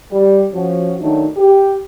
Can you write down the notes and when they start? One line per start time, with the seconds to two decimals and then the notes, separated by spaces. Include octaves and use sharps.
0.11 G3
0.52 F3 C#4 F#4
0.99 D#3 F#3 A3 D4 D#4
1.37 G4